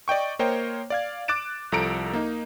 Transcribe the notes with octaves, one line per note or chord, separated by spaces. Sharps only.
D5 D#5 G5 C#6
A#3 A#4 C5 C#5 D#5 G5
D5 F5 G#6
D6 F#6 A6 D7 E7
C2 F3 A4 A#5 C#7 D7
A#3 D#4